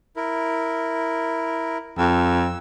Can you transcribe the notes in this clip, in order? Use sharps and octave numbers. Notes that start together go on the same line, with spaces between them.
E4 A#4
F2 E6